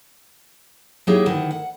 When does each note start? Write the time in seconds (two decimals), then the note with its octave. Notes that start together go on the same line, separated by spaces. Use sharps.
1.07 F#3 A#3 D#4 E4 G4 G#4
1.26 D2 D#3 E4 F#5 A5
1.51 F#5